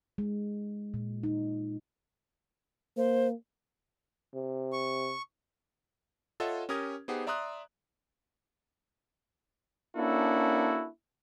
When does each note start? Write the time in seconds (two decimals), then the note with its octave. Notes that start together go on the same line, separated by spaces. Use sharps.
0.18 G#3
0.94 A#2
1.23 D#4
2.97 A#3 C5
4.35 C3
4.72 C#6
6.40 F4 A4 C#5 D#5 E5 F#5
6.69 C#4 G4 A#4 D#6 G#6
7.08 B3 D#4 G4 G#4 C5 F#5
7.27 D5 E5 A#5 C6 D#6 F#6
9.97 A#3 C#4 D4 E4 F#4 A4